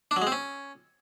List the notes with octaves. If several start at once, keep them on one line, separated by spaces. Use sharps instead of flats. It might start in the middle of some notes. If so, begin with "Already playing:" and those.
D4
F#3
G#3
C4
C#4